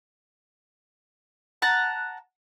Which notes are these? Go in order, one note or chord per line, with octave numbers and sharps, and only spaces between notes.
F#5 A5 A#5